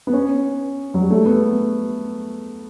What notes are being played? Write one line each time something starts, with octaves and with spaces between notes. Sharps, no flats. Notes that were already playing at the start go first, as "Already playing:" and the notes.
B3
C#4
F#3
G3
A3
B3